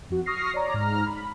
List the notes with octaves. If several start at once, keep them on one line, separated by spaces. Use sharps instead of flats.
F2 F#4
C#6 D#6 F6 A#6 C7
C#5 D5 A#5
G#2 A#5 F6
B5